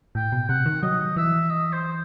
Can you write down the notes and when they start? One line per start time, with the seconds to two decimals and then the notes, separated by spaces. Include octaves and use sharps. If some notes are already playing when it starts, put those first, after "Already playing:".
0.15 A2 G5
0.32 B2
0.49 C3 F#5
0.66 D#3
0.83 F#3 D#5
1.16 E3 E5
1.51 D#5
1.73 C5